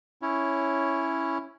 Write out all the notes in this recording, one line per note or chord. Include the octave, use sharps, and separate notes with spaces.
C#4 E4 C#5